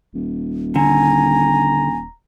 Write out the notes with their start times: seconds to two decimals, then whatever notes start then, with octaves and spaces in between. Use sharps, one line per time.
0.14 D#1
0.76 D3 G#5 A#5